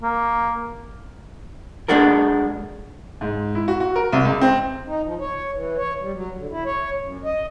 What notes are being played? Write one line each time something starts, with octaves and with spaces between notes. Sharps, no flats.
A#3
G#3 D4 F#4 A4 A#4
G#2
E4
F#4
F#4
A#4
C2
C#2
C4
D#4
F3
C#5
E3
C#5
G3
F#3
D3
E4
C#5
F#2
D#5